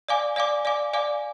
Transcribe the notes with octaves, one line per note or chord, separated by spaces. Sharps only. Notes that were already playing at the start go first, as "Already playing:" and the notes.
D5 F5 G#5 D6
D5 F5 G#5 D6
D5 F5 G#5 D6
D5 F5 G#5 D6